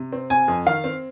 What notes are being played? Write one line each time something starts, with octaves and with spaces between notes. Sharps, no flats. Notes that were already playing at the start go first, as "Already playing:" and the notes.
Already playing: C3
C4
C3 G#5
F2
D#3 F5
C4